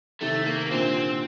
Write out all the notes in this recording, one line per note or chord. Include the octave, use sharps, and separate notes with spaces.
C3 D#3 A3
A#3
A#3
A#2 D3 C4